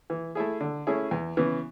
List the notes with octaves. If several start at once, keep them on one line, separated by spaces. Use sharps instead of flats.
E3
A3 E4 G#4
D3
A3 C#4 E4 G#4
E2
C#3 E3 B3